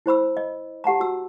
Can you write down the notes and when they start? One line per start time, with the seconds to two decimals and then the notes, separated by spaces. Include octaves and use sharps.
0.06 E4 C5 B5 E6
0.37 D#5
0.84 G4 F#5 A5 A#5
1.00 F#4 E6